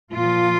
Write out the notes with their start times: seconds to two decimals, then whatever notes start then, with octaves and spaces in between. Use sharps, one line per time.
0.12 A#2 F3 F4